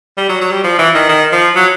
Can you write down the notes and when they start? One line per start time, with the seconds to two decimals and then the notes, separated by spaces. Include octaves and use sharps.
0.17 G3
0.29 F#3
0.41 F#3
0.52 G3
0.63 F3
0.79 E3
0.94 D#3
1.09 D#3
1.32 F3
1.55 F#3